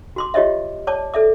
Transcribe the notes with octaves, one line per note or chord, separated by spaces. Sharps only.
F#4 C6 D6
F4 G4 C#5 D#5 E5
C#5 D5 A5 D6
A4 D5 E5 D6